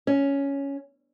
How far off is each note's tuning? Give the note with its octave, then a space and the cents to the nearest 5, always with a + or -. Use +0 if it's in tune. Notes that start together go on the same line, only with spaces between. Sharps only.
C#4 +5